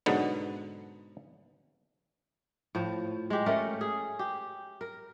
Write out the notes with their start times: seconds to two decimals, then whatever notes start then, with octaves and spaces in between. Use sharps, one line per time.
0.06 G#2 B2 D3 F#3 B3
2.75 A2 F3
3.30 G#3 G4
3.46 A3 C#4 A#4
3.81 G#4
4.19 G4
4.81 A#4